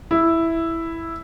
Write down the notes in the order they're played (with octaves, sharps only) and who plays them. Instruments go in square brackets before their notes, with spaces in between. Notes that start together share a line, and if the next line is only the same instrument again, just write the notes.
[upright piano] E4